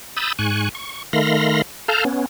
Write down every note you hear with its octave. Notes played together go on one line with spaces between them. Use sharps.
B5 D#6 E6 G6 A6
G#2 G#5 C#6 F#6
C#6
D#3 A3 F5 B5 C6 A#6
A4 F5 A5 A#5 F6 G6
B3 C#4